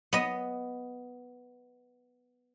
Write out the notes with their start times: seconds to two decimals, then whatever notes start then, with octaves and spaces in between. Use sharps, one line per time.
0.13 B3 D#5